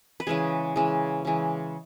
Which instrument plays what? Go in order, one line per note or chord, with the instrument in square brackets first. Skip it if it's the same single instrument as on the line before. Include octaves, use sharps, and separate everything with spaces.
[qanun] B4
C#3 E3 G#3 G#4
C#3 E3 G#3
C#3 E3 G#3